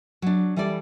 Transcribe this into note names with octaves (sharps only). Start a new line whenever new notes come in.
F#3 D4
E3 G3 E4 A4 D5